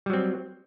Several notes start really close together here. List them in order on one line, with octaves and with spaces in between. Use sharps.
G3 F#3 C4